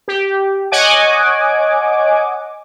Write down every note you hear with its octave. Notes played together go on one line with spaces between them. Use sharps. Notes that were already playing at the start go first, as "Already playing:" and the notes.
G4
C#5 D#5 F#5 G#5 D6